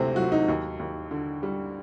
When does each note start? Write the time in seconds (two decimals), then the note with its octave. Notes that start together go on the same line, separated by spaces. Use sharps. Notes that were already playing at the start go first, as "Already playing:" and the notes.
Already playing: D2 C3 A3 C4
0.16 F#3 F#4
0.32 D#4
0.48 D#2
0.79 D#2
1.11 D3
1.43 G3